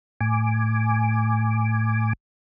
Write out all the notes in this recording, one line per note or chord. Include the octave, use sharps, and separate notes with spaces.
A2 G#5 D6